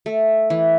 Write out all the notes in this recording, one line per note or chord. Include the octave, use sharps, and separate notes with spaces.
A3
E3